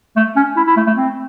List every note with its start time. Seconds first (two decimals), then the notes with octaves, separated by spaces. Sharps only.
0.16 A3
0.36 C#4
0.57 E4
0.67 E4
0.77 A3
0.87 A3
0.97 C4